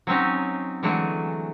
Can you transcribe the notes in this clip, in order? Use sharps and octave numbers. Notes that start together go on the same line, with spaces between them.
F#3 C4 C#4 D#4
D3 E3 F#3 G#3 A3